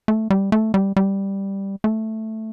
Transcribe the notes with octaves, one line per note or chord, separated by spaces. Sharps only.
A3
G3
A3
G3
G3
A3